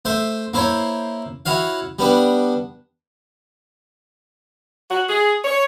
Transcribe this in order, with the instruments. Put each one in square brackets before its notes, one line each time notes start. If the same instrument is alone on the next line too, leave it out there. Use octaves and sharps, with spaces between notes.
[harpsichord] A3 C5 E5
A#3 E4 C5 C#5
E4 F#4 C#5 F5
G3 B3 D4
[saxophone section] F#4
G#4
C#5